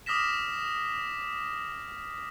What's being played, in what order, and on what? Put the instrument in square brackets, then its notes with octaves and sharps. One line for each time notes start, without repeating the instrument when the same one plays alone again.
[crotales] D6 D#6 F6 A#6 B6 E7